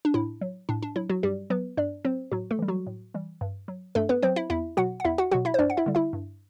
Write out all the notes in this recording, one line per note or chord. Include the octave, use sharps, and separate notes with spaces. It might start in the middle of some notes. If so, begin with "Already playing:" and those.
D4
A2 E4
F#3
A2 D4
D4
F#3 E4
F#3 F#4
G2 G3 G4
F#3 B3 B4
G2 D4 D5
F#3 C4 C5
A2 F#3 F#4
A3 A4
E3 G3
F#3 F#4
A2
E3 G3
G2
F#3
G2 A3 A4
B3 B4
F#3 C4 C5
E4 E5
E2 E4 E5
B2 F#3 F#4 F#5
F#5
E2 E4 E5
F#4 F#5
B2 F#3 F#4 F#5
E4 E5
C5
G2 D4 D5
F#5
E4 E5
D3 G3
E4 E5
G2